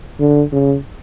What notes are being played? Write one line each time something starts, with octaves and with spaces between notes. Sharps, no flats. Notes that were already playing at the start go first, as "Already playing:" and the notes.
D3
C#3